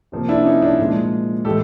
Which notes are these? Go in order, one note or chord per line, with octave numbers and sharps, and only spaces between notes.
C3 F3 A#3
D4 E4
C#4 D#4
D4
A#2 F3 G#3
A2 E3 G#3 G4 A4